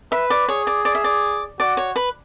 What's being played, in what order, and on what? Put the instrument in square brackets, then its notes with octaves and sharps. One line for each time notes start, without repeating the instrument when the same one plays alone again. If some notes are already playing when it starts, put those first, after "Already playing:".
[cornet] B4 [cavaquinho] E5
[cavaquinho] D5
[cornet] G#4 [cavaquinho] C#5
[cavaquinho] D5
D5
E5
D5
[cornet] F#4 [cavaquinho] D5
[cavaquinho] C#5
B4